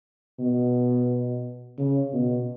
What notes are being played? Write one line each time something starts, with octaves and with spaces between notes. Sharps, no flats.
B2
C#3
B2